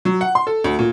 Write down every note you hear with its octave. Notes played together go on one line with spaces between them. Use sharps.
F#3
F#5
C6
A4
D2
A#2